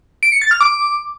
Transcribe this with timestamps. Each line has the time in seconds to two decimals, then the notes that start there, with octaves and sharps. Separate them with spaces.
0.23 D7
0.32 C#7
0.42 A6
0.51 F6
0.61 D6